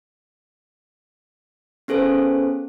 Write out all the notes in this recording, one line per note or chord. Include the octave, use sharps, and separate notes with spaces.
B3 C#4 G#4 A4 C5